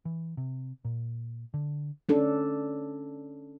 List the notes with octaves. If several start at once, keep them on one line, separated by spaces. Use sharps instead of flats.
E3
C3
A#2
D3
C#4 D4 A4